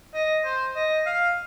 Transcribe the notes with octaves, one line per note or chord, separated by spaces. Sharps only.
D#5
C5
D#5
F5